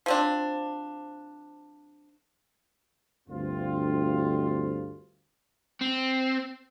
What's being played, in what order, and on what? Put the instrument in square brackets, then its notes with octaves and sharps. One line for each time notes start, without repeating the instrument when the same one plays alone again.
[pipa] F3 C4 D4
[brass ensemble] D2 G2 C4 F4
[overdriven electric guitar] C4